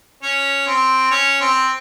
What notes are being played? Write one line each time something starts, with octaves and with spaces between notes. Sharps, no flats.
C#4
C4
C#4
C4